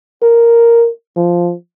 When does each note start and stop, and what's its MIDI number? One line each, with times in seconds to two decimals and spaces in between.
0.22 0.89 70
1.17 1.54 53